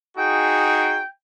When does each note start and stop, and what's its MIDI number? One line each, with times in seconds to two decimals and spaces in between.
0.18 1.01 63
0.18 1.01 66
0.18 1.01 68
0.18 1.06 79